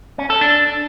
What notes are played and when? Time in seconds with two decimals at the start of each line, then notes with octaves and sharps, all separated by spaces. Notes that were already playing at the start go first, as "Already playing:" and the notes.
0.18 C#4
0.30 A4
0.41 D4